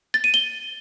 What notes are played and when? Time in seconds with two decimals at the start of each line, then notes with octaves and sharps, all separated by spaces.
0.14 A6
0.24 D#7
0.34 G7